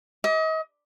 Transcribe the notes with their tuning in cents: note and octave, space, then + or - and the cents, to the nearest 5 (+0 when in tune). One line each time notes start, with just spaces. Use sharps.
D#5 +35 D6 +0